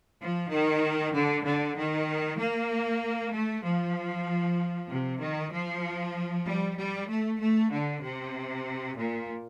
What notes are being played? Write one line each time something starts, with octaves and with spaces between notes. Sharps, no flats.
F3
D#3
D3
D3
D#3
A#3
A3
F3
C3
D#3
F3
G3
G3
A3
A3
D3
C3
A#2